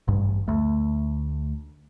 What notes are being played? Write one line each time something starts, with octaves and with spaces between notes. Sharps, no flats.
A1 G2
D2 A3